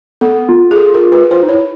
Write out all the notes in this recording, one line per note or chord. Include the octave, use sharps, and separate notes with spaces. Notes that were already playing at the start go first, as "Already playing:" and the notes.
B3 A4
F4
G#4
A4
A#4
B4
F4 C5
D#4
E4 C#5